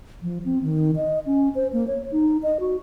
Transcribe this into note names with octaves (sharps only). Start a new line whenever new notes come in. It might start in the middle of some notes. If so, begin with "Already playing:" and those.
F3
C4
D#3
D#5
C#4
C5
A#3
C#5
D#4
D#5
F#4